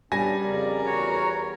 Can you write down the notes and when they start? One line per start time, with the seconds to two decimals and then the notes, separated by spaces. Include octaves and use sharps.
0.12 G3 B3 C#4 D4 G#5 A#6
0.44 F2 C#3 A#4 D5
0.86 E2 F#4 C#5